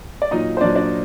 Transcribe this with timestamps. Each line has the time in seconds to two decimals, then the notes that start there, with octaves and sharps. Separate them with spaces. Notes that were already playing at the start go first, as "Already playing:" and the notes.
0.22 D5
0.31 A#2 F#3 D#4 D#5
0.57 C5
0.61 A#2 F#3 D4 D5
0.75 D4 D5